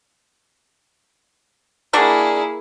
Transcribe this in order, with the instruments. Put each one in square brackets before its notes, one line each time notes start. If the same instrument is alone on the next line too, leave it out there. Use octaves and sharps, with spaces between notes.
[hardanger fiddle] A#3 E4 [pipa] D4 F#4 A#4 [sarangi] G#4